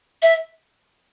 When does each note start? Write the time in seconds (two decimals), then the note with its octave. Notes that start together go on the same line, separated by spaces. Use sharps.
0.22 E5